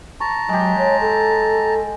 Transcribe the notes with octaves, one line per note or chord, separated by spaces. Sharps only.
A5 A#5 C#6
F#3 G#3 G4
C#5
A4